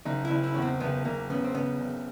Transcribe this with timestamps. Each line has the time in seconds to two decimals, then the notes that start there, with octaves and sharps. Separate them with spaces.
0.05 F#1 D#4
0.25 E4
0.31 F#1
0.44 E4
0.54 E2 C#4
0.62 C4
0.80 F#1 B3
1.05 F#1 A#3
1.30 C#3 B3
1.44 C4
1.55 C#3 B3
1.80 F#1